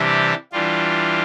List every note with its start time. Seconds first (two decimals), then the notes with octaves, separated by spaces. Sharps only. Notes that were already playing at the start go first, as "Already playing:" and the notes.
Already playing: C3 E3 G3 D4 G4
0.52 E3 G3 D4 F4